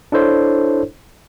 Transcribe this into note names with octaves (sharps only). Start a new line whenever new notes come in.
D4 E4 A4 C5 C#5